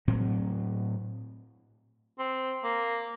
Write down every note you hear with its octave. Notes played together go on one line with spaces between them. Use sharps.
A2 F#3 C4
C4
A#3